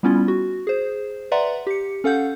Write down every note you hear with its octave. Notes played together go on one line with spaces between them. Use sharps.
G3 B3 C#4 E4 F4
F#4
G#4 C5
B4 D5 E5 F#5 A#5 C6
G4 C#7
C#4 A4 F5 F#5 G6